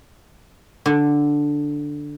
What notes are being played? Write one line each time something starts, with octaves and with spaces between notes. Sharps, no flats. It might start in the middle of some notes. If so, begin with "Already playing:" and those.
D3